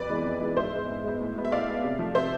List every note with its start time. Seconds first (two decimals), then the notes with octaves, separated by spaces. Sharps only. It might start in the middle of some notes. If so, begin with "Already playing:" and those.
Already playing: F2 B4 D5
0.09 E3 G#3 B3
0.25 F2
0.40 E3 G#3 B3
0.56 G#2 C5 E5
0.72 G#3 B3
0.89 G#2
1.04 G#3 B3
1.20 A2
1.36 G#3 B3
1.45 E5
1.51 A2 D5 F5
1.68 G#3 B3
1.83 C3
1.99 F3 A3
2.15 C3 C5 E5